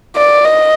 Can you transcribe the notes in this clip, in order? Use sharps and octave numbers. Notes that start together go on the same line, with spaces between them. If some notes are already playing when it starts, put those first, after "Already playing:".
D5
D#5